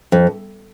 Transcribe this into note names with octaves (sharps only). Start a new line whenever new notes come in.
F2